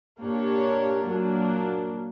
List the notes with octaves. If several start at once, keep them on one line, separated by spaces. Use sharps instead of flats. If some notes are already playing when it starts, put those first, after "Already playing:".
A#2 A#3 D4 G4 C#5
A#2 F#3 A#3 D4